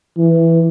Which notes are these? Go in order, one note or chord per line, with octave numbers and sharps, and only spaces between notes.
E3